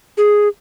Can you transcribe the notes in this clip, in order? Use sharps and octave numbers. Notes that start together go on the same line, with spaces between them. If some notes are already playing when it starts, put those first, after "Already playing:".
G#4